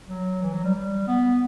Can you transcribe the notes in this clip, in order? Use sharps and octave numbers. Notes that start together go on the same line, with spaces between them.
F#3
E3
F#3
G3
G3
B3